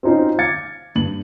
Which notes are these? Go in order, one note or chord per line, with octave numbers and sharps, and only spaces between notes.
C4 C#4 D#4 F4 C5
F5 D6 G#6 A6 C#7
G2 F#7